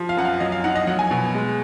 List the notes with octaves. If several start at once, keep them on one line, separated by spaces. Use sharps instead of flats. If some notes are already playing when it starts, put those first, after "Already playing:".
Already playing: F3
F5
F#2 F#5
F5
F#3 D#5
F5
D#4 F#5
D#5
F#3 F#5
G#5
B2
G#3